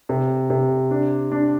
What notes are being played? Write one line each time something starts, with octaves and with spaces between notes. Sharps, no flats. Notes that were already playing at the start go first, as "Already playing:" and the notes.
C3
C3
D4
D4